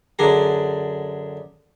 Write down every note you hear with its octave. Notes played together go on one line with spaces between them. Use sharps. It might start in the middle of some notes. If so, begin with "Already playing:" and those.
F#2 D3 D4 G#4 A#5